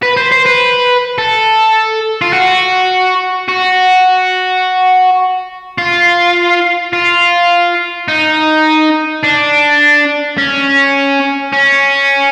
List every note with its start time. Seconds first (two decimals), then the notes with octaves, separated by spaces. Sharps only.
0.03 B4
0.17 C5
0.32 C5
0.46 B4
1.18 A4
2.21 F4
2.33 F#4
3.48 F#4
5.78 F4
6.93 F4
8.08 D#4
9.23 D4
10.38 C#4
11.53 C#4